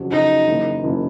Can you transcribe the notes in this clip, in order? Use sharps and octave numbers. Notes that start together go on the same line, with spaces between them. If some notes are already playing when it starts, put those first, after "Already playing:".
Already playing: F2 C#3 F#3
F2 C#3 F#3 D#4
F#1 F#2 C#3 E3
F#1 F#2 C#3 E3